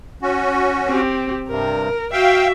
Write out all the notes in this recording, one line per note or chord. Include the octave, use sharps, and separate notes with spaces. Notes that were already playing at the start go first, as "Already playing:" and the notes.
C#4 F#4
C4 G4
G2 C3 A#4
F#4 E5 F5 G5